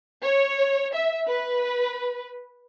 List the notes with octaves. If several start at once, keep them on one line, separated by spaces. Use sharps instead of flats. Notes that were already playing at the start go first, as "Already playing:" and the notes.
C#5
E5
B4